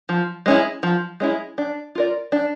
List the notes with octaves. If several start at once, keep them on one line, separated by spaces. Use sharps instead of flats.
F3
G#3 C#4 E4
F3
G#3 C#4 E4
D4
F4 A#4 D5
D4